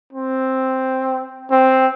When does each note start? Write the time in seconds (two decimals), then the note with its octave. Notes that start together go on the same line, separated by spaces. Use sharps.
0.13 C4
1.51 C4